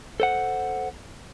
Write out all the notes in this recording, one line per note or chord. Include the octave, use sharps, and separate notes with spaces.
A4 C5 F#5